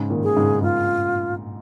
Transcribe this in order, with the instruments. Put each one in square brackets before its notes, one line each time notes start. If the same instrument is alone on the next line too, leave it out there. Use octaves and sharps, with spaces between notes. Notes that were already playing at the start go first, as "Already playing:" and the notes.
Already playing: [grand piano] G#2 C#3
A#2 D#3
[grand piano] D#3 [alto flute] G#4
[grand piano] G#2 C#3
[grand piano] G#2 [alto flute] F4